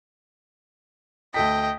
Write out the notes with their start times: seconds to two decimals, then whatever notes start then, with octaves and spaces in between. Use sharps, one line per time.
1.34 D2 A4 D#5 G5 B6